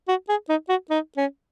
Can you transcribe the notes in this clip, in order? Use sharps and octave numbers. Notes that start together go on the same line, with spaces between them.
F#4
G#4
D#4
F#4
D#4
C#4